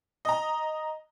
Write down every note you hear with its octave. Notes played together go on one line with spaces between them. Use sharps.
D#5 A#5